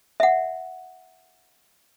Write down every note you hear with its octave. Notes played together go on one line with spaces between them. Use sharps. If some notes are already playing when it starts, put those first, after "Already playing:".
E5 F#5